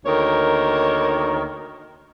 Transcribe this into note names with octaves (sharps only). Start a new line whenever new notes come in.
D2 D#3 A#3 A#4 C#5